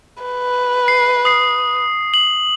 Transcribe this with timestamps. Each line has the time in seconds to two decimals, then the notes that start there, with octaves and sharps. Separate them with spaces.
0.23 B4
0.88 C7
1.25 D#6 C7
2.14 F#7